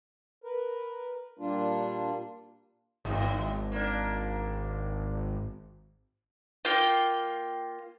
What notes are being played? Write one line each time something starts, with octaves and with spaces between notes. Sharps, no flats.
A#4 B4
A#2 G3 A#3 D4 F4
G#1 D#2
A#3 D4
A#3 F4 G5